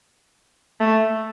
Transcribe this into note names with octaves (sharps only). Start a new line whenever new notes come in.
A3